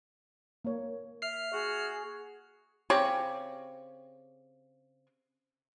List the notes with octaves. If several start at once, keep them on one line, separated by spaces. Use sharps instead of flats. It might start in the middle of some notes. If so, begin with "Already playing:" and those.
A#3 C#5
E5 F6 C7
F#4 G#4
C#3 C4 G4 C#5